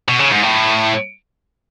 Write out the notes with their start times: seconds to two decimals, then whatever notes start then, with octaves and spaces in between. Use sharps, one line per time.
0.08 B2
0.19 C#3
0.31 G#2
0.43 A2